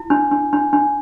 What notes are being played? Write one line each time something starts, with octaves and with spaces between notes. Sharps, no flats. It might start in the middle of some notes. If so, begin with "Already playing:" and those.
Already playing: E4
D4
D4
D4
D4